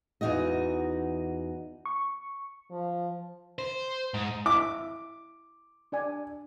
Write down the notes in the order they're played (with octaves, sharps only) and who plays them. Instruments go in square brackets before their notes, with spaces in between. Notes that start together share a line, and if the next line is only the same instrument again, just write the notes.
[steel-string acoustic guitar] E2 E3 D#4 F#4 D#5
[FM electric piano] C#6
[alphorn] F3
[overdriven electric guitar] C5
G#2
[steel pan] E4 E5 [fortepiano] D6
[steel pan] D4 D5 G#5